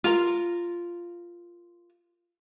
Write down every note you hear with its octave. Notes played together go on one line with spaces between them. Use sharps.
F4 A#4